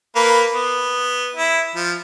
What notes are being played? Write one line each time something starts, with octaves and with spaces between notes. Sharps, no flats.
A#3 B4
B3
E4
F3